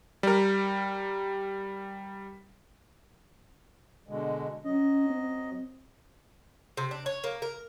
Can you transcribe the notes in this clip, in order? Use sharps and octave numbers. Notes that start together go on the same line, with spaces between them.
G3 A#4
B2 D3 G#3
F#3 C#4 D#5
C4
C3
D4
C#5
A#3
A#4